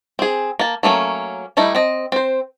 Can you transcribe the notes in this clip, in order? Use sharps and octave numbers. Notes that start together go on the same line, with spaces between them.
C4 G#4
A#3 A5
F#3 A3 A#3 C#4
G3 A3 D#4 E4
C4 D#5
C4 C5